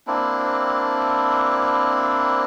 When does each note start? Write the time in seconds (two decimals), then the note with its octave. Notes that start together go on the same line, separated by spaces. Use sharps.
0.07 A#3 C4 D4 E4